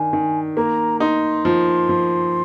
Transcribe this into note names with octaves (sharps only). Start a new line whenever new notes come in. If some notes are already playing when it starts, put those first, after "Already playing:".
Already playing: D#3 D4 G#5
D#3
A#3 A#5
D#4 C6
F3
F3